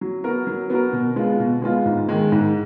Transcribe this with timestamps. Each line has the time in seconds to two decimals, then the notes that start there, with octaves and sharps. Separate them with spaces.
0.01 F#3
0.24 B3 F#4 A#4
0.47 F#3
0.70 B3 F#4 A#4
0.93 B2
1.16 G#3 B3 F4
1.40 B2
1.62 G#3 B3 F4
1.86 G#2
2.09 D#3 G#3
2.32 G#2